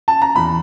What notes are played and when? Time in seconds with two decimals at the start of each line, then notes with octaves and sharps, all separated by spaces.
0.08 A5
0.22 A#5
0.36 E2 B5